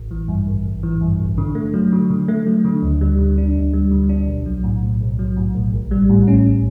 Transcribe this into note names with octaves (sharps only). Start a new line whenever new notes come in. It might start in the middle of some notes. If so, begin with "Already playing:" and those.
Already playing: A1
E3
G2
A1
A1
E3
G2
A1
D3
A3
F#3
D3
D3
A3
F#3
D3
D2
G3
D3
D4
D2
G3
D3
D4
B1
F#3
A2
B1
B1
F#3
A2
B1
A1
G3
A2
C#4